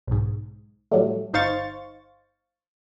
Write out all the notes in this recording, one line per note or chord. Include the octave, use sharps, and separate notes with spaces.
B1 G#2
A2 F#3 G3 A3
G1 D#4 C5 F5 C#6 A6